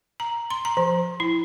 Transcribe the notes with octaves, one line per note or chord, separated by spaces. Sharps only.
A#5
C6
A#5
F3
E4